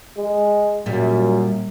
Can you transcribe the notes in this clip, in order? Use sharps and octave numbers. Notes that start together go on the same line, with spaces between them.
G#3
F#2 A#2 G3